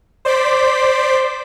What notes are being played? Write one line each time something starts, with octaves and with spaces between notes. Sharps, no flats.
C5 D5 C6 D6 B6